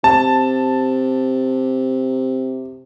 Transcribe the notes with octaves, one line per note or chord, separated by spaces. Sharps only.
C3 A5